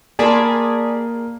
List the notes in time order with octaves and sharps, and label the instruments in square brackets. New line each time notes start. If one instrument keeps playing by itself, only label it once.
[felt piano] A#3 [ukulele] F4 A5 [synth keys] G#4 D5 B5